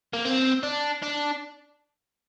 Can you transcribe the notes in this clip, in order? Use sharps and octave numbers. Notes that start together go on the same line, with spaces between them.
A#3
C4
D4
D4